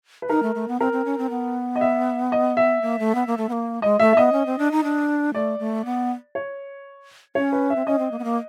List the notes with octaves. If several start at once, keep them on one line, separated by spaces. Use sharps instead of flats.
B4
D#4 A#4
A3
A3
B3
C4 A#4
C4
C#4
C4
B3
D#5
E5
D#5
E5
A#3
A3
B3
A#3
A3
B3
A#3
G#3 D#5
A3 E5
E5
B3 D#5
C#4
C4
D4
D#4
D4
A3 D5
A3
B3
C#5
C#4 C#5
B4
E5
C4
C#4 D#5
C4
A#3
B3
A#3